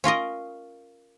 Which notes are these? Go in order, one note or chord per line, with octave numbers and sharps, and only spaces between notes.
C#4 F4 A#4 D#5